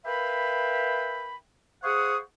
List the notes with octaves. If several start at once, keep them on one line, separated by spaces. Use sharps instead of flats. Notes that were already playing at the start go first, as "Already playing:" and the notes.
A#4 B4 E5 F5 G5 B5
G#4 C5 F5 F#5 C#6 D#6